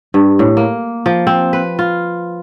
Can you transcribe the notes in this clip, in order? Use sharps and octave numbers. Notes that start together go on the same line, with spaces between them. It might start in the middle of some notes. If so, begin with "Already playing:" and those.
G2
A2
A#3
F3
C4
B4
F4